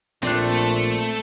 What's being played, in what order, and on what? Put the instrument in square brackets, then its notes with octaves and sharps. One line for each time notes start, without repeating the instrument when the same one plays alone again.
[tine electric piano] A#1 D5 C7 [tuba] A#2 [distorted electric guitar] A3 [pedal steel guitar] C4 F#6